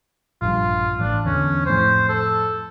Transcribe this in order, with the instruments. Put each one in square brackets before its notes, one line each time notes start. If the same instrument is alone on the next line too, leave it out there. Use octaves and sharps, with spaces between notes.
[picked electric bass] A#1 G2 [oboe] F4
[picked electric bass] A1 [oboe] D4
[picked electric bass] E2 D3 [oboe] C#4
[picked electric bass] F2 A2 [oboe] C5
[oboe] A4